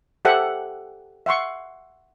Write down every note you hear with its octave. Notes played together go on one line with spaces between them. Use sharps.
G4 A4 C5 E5 F#5
E5 F#5 C6 C#6